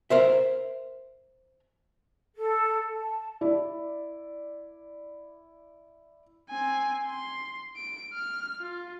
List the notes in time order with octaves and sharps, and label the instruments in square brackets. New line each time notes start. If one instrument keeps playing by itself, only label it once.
[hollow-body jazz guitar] A#4 C5 E5
[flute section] A4
A5
[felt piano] E4 D5
[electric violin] C4 G#5
C6
D7
F6
F4